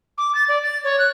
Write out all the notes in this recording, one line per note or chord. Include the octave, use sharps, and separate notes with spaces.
D6
A6
D5
A6
C#5
F#6